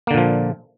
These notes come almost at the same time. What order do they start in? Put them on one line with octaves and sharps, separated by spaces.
A#3 D3 A#2 F3